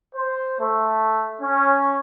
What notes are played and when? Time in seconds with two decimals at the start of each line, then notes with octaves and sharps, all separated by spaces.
0.14 C5
0.59 A3
1.40 C#4